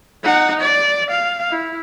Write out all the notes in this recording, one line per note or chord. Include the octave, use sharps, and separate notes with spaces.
D#4 F#5
D5
F5
E4